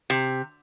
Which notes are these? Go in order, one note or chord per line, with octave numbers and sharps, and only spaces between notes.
C3